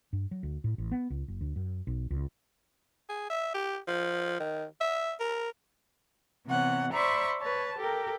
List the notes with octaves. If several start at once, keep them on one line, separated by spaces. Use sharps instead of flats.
G2
F#3
D2
A2
A1
B3
C#2
F#1
D2
F#2
B1
C#2
G#4
E5
G4
F3
D#3
E5
A#4
C3 E3 B3 C#5 F#5
C5 D5 E5 A#5 B5 C#6
B4 C#5 A5
G4 A4 A#4 G5